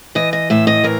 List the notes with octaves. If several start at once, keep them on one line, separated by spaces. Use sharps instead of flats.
E3 D#5
D#5
A2 E5
D#5
E3 A#4